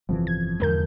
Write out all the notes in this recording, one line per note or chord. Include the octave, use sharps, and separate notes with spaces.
G1 F2 C3 E3
G#6
E2 G#2 D3 G#3 A#4 G6